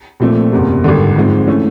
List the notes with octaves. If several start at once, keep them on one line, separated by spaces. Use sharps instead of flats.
A#1 A#2 F3 A3 C4
F#1 E2 C3
G#1 G2 D3
G#2 F3 G#3 C4
E3 A3 C#4